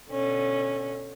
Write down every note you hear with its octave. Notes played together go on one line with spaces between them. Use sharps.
B2 D3 C#4